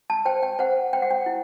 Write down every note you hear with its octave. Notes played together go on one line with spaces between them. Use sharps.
A5
C5 G5
G5
C5 F#5
C5 G5
F#5
G5
E4